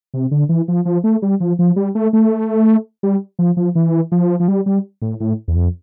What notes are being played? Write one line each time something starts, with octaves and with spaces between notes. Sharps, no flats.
C3
D3
E3
F3
F3
A3
G3
F3
F3
G3
A3
A3
G3
F3
F3
E3
F3
F3
G3
G3
A2
A2
E2
F2